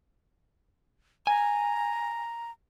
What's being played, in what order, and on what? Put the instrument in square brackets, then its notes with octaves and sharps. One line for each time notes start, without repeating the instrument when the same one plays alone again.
[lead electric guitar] G#5 [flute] A#5